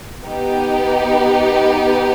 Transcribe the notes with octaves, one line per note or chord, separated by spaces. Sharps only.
B3 D#4 G4 B4